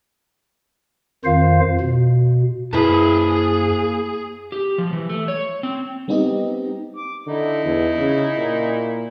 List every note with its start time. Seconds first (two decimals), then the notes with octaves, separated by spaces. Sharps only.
1.25 F2 D#3 F4 C5 F5
1.80 B2
2.73 F#2 A#3 E4 G#4 B4 C5 A5
4.52 G4
4.78 F3
4.93 E3
5.09 A3
5.28 C#5
5.63 C4
6.08 G3 B3 C4 D#4 G4 D#5
6.97 D6
7.26 D3 D#4 E4
7.65 E2
7.99 C#3
8.37 A#2